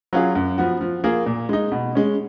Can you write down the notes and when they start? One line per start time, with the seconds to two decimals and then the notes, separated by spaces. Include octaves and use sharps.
0.13 F#3 C#4 F4 G#4
0.35 F#2
0.58 F3 B3 F#4
0.81 F3
1.04 A#3 F4 G#4
1.26 A#2
1.49 G#3 D#4
1.72 B2
1.95 G#3 C#4